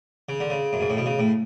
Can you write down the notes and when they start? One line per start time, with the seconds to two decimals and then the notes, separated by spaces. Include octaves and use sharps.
0.29 C#3
0.40 D3
0.50 C#3
0.73 F#2
0.81 G#2
0.90 A2
0.97 B2
1.06 C#3
1.19 A2